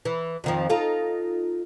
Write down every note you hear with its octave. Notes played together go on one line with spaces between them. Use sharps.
E3
F2 D#3 F3
D#4 F4 A4